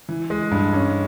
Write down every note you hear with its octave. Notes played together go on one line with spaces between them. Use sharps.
E3
G#3
G2
C#4